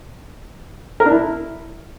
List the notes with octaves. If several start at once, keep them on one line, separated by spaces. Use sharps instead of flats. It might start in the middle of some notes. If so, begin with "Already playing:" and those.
A#4
D4
E4